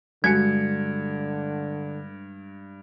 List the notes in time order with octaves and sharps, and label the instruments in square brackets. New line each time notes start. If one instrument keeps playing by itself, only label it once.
[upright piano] G2 C#7 [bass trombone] D3 [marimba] G#3 F#4 G#5 [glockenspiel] G#6